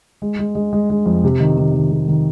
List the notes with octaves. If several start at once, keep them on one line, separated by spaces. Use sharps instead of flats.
G#3
G#3
G#3
G#3
G#3
F2
C3
D#3
D#3
D#3
C3
D#3